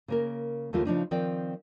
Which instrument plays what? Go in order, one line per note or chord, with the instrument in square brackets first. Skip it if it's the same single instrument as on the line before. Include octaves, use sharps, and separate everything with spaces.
[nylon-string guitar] C#3 A#3 A#4
D#2 C#3 A3 A#3 F4
C#3 F3 D4 D#4
D#3 F3 C4 D5 G5